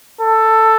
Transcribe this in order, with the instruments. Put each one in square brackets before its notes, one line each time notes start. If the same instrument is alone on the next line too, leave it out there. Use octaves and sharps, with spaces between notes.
[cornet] A4